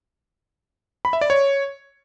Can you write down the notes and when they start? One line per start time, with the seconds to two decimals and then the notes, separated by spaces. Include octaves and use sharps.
1.05 B5
1.13 E5
1.21 D5
1.30 C#5